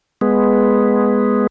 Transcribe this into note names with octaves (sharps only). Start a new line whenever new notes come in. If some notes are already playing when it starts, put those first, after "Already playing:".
G#3 B3